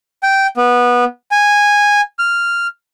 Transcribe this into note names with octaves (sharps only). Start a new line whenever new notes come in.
G5
B3
G#5
F6